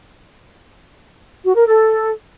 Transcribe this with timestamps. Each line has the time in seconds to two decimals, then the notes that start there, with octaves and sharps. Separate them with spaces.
1.44 F#4
1.55 A#4
1.67 A4